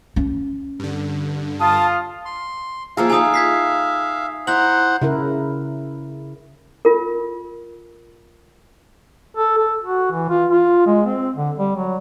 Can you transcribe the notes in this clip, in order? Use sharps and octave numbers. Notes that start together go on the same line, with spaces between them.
C#4
G2 D3
F4 F5 A5 D#6
C6
F3 A#3 G#4 E5 F5
D#4 G#4 A4 G#5 D#6
G#6 B6 C7
E4 C5 F#5 A#5 F#7
C#3 E4 A#4
F4 A#4
A4
A4
F#4
E3
F4
F4
G#3
C4
D3
G3
F#3